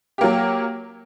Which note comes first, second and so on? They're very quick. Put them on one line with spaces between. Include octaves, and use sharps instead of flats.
G4 A#3 F#3